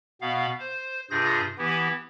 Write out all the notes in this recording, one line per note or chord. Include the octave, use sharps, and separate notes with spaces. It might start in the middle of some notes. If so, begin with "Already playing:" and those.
B2 B3 F5
C5
G2 C3 F4 G#4 G6 A#6
E3 B3 E4 G4